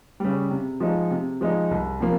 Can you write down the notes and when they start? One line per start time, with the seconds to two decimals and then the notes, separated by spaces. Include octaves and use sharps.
0.20 C#3 G3
0.50 C3
0.80 F3 G#3 D#4
1.10 C3
1.41 F3 G#3 D#4
1.71 C2
2.00 C3 F3 A#3